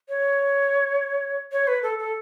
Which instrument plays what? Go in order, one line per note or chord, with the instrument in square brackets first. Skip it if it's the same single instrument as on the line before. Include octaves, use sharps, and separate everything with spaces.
[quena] C#5
C#5
B4
A4
A4